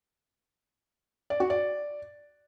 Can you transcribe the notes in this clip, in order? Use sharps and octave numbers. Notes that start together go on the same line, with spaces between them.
D5
F#4
D5